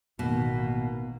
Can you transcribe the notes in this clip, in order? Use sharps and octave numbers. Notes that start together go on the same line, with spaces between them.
A1 B2 D#3 A#3